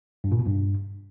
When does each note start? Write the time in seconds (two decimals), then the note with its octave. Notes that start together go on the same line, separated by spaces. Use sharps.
0.24 G2
0.32 A#2
0.39 B2
0.47 G2